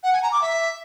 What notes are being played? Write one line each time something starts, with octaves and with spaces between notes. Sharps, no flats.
F#5
G#5
A#5
D6
E5